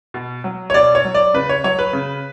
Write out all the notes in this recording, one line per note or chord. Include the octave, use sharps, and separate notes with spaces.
B2
F#3
C#5
B2 D5
C#5
F#3
D5
C#3 B4
C#5
F#3 C#5
B4
C#3